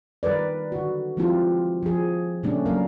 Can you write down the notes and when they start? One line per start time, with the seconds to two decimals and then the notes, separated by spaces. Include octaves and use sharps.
0.23 D#3 G3 A#4 B4 D5
0.72 D3 F#4
1.17 F3 G#3 C4 E4 F4 G4
1.83 F3 G#4
2.43 A#2 C#3 G3 A3 C#4 D4
2.66 F#3 A#3 A#4 F5